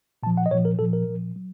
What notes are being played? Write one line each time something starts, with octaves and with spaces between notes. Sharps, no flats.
A#2 F3 A5
F#5
D#5
A#2 F3 C#5
A#4
A#2 F3 A4
A#4
A#2 F3
F#3